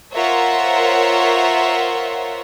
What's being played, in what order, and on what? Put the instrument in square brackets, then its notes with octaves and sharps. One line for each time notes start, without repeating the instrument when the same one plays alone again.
[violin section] F4 A#4 C5 C#5 E5 F#5